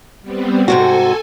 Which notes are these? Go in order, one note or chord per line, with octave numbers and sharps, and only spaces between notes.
G3 B3 C4
G#2 C3 F#4 A4 G#5